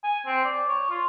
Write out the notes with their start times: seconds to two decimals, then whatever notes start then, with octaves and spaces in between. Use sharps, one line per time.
0.04 G#5
0.26 C4
0.45 D5
0.68 C#5
0.90 F4